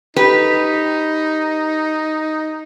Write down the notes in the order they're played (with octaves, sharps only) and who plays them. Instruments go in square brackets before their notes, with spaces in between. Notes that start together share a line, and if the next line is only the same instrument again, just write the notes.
[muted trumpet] D#4 [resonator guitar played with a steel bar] G4 B4